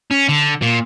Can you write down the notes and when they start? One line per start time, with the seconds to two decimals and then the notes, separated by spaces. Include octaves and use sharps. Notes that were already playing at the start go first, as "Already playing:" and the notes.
0.11 C#4
0.29 D3
0.62 A#2